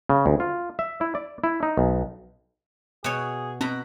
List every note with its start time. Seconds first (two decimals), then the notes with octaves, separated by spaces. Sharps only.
0.09 C#3
0.26 D2
0.40 F4
0.79 E5
1.01 E4
1.15 D5
1.44 E4
1.63 D#4
1.78 B1
3.04 B2 G#4 C#5
3.61 B2 C4 A#5 B5